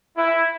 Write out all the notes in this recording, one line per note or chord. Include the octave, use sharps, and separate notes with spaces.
E4